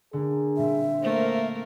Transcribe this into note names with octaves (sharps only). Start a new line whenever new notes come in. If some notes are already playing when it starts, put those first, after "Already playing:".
D3 A#3 G#4
A#2 G3 C4 E5
A3 A#3 A#4 C5